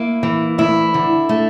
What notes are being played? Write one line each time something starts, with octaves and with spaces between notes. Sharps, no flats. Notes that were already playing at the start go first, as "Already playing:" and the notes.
Already playing: A#3 E4
E3
D2 E4
D3
A3